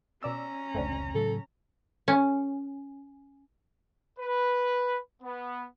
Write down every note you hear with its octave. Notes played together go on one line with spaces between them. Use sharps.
B2 C#4 D5 A#5 E6
F1 C#2 A3 C4 D4
A2 C#3 F#3 A4
C#4
B4
B3